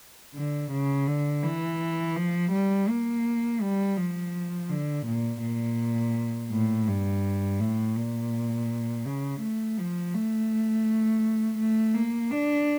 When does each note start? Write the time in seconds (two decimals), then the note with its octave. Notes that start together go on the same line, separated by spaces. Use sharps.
0.35 D3
0.72 C#3
1.07 D3
1.43 E3
2.16 F3
2.52 G3
2.89 A#3
3.62 G3
3.97 F3
4.69 D3
5.06 A#2
5.42 A#2
6.51 A2
6.87 G2
7.60 A2
7.96 A#2
9.05 C#3
9.41 A3
9.77 F3
10.14 A3
11.59 A3
11.94 A#3
12.31 D4